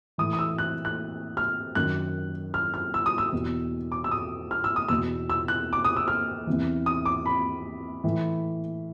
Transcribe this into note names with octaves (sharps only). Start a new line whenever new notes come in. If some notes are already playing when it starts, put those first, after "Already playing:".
A2 E3 D#6
D#6
E6
F#6
F#6
F6
F#2 D#3 F#6
F6
F6
E6
D#6
E6
E2 B2
D6
E6
D#6
F6
E6
D#6
E2 B2 E6
E6
F#6
D6
D#6
E6
F6
E2 C3 E3
D#6
D6
B5
A2 E3